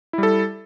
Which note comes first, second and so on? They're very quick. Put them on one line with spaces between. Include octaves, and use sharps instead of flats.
E4 G3 A4